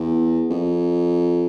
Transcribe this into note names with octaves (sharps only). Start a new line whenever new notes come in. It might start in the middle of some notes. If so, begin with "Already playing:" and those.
Already playing: E2
F2